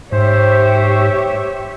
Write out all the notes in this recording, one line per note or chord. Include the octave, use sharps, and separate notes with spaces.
G#2 G4 C5 C#5 E5